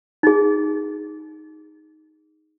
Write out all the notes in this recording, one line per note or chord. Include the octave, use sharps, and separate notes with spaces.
D#4 G#4